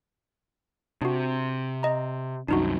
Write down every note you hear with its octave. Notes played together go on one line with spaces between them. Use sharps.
C3 D4 F#4
D#5 A#5
C2 F#2 D4 D#4 F#4